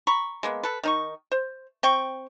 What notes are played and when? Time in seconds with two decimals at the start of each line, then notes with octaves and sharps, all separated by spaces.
0.07 A#5 B5 C#6
0.43 G#3 A#3 B3
0.63 A4 B4
0.84 D#3 D#4 C#6
1.32 C5
1.83 C4 G5 C#6